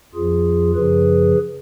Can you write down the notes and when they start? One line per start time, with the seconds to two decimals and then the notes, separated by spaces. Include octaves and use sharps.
0.14 F2 F3 F4 G#4
0.75 F#2 C#3 F3 G#4 B4